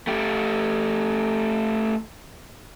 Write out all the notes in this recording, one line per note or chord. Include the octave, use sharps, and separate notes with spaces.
A3 G4